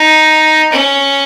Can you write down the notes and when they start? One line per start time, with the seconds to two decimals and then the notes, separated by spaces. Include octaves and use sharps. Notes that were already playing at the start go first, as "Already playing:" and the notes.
Already playing: D#4
0.72 C#4